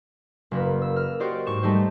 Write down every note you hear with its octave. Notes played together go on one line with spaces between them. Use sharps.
F#1 A#3 B4
E6
F6
F#4 G4 C5 D5 D#5
G#2 C#6 E7
G3 A3 D#4 G4 C5